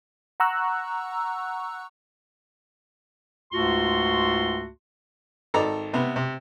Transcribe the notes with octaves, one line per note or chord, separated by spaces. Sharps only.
F#5 A#5 C#6 E6 F#6
C#2 G#2 A3 F4 F#4 C6
G#1 A4 D5 D#5 A#5
C3 B3
C3